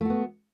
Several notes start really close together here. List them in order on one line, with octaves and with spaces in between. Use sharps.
A3 F#4 B3